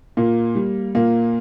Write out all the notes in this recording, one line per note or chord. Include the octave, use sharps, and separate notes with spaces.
A#2 A#3
G3
A#2 A#3